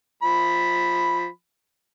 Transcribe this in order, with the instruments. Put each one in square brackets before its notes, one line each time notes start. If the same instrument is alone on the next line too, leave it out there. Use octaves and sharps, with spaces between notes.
[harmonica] F3 B5